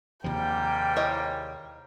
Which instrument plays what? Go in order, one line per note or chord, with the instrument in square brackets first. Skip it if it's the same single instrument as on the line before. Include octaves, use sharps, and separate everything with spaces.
[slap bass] D#2 C3 F3 [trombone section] G#2 G3 A#3 [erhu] G5
[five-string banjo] E4 C#5 D#5